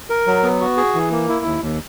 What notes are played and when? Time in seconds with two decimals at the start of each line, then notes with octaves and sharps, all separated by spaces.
0.10 A#4
0.27 F#3
0.43 B3
0.61 F#4
0.77 G#4
0.94 E3
1.12 A#3
1.29 E4
1.45 D#2
1.62 D#2